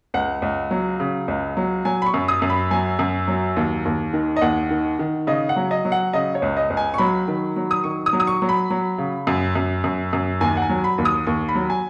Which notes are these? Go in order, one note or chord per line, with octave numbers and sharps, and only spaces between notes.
C#2 F#5
C#2
F#3
C#3
C#2
F#3
F#3 G#5
B5
C#6
F#2
D#6
F#2
B5
F#3 G#5
F#2
F#3
D#2
D#2
D#3
D#5
D#2 F#5
D#3
D#3
C#3 D#5
F#5
F#3
D#5
F#3
F#5
C#3 D#5
C#5
C#2
D#5
C#2
G#5
C#6
F#3 B5
D#3
F#3
D#6
D#3 C#6
D#6
F#3
D#6
C#6
F#3
B5
F#3
C#3
F#2
F#2
F#2
F#2
D#2 G#5
F#5
G#5
F#3
B5
D#2
D#6
D#2 C#6
B5
F#3
G#5